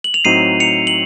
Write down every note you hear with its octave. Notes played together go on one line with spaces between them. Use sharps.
F#7
F7
A2 F#3 C4 D#4 C7 D#7
C#7 F7
F#7